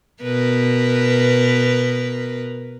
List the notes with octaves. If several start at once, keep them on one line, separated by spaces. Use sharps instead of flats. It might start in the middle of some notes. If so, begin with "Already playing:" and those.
B2 A#4 B4